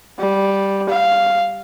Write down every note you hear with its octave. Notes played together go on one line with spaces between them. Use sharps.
G3
F5